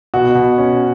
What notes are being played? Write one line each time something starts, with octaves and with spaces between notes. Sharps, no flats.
B2 F#4
B2
C#4